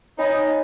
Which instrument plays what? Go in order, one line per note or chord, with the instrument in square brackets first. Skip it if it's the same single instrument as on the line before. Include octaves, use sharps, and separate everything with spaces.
[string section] D#4 [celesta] C#5 G#5 B5